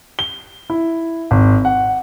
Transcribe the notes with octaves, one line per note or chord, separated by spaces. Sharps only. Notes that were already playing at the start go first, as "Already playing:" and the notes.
G7
E4
G#1
F#5